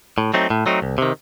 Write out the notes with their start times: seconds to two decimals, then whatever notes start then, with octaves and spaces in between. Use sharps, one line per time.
0.18 A2
0.34 F#3 A3 C4 D#4
0.50 A2
0.66 F#3 A3 C4 D#4
0.82 C2
0.98 C3 D#3